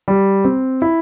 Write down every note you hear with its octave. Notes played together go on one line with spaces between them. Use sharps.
G3
C4
E4